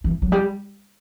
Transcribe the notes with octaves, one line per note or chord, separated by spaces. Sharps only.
E3
F#3
G3